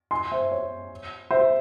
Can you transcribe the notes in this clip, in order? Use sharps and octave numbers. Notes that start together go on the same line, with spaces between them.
G#5 C6
C5 E5
C#5
C5 E5